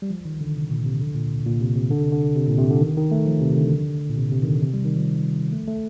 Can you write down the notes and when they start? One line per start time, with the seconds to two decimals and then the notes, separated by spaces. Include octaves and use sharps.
0.02 G3
0.10 F3
0.25 D#3
0.41 D3
0.55 C3
0.70 A#2
0.86 C3
1.01 D3
1.15 A#2
1.31 C3
1.46 A#2
1.61 C3
1.76 C3
1.91 D3
2.02 C3
2.12 D3
2.36 C3
2.48 A#2
2.58 C3
2.70 D3
2.81 D#3
2.97 D#3
3.11 A3
3.26 F3
3.42 C3
3.52 C3
3.57 D3
4.10 A#2
4.17 C3
4.32 C3
4.43 D#3
4.47 D3
4.62 C3
4.74 G3
4.85 D#3
4.96 F3
5.52 A3
5.67 A3